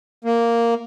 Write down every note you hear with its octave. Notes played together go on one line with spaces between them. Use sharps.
A#3